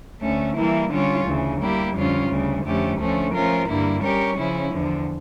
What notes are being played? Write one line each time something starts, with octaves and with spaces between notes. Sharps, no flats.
D2 D3 A3 C#4
E3 G3 A#3 E4
D3 G3 C#4 F4 C#5
D2 C#3 E3
G3 A#3 E4 G4
F2 D3 G3 C#4 F4
D2 C#3 G3
F2 D3 A3 C#4 G4
D2 D3 F3 A3 C#4
F3 A3 C#4 F4 A#4
G2 D3 G3 A#3 E4
G3 C#4 G4 A#4 C#5
C#3 F3 C#4 E4
E2 D3 F3